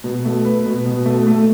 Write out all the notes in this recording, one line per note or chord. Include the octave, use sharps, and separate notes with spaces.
B2
A3
B4
B2
B2
A3
A3